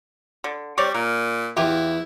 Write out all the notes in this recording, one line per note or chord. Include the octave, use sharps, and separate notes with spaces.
D3
G3 C4 C#5 D5
A#2 A#4
E2 E3 E4 F4 G4